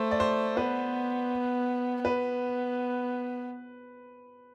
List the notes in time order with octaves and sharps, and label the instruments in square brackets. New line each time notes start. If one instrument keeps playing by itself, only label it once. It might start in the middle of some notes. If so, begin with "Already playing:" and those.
Already playing: [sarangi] A3 [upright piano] C5
[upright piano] D5
C5
[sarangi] B3 [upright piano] B4
[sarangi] B3 [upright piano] B4